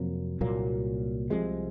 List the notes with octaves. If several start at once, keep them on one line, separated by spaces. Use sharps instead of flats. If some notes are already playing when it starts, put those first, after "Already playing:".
Already playing: F2 C3 F#3 A#3
C2 A#2 F#3 A#3
C2 C3 F3 G#3